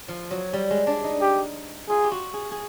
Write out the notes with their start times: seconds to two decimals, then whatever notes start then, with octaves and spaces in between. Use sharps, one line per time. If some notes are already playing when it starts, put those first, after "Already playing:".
0.08 F3
0.31 F#3
0.53 G3
0.70 G#3
0.87 D4
1.04 D#4
1.21 G4
1.89 F4 G#4
2.04 G4
2.11 F#4
2.34 G#4
2.51 G#4